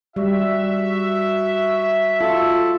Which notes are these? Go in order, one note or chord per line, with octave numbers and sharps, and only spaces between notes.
G3 F#4 E5
F4 A4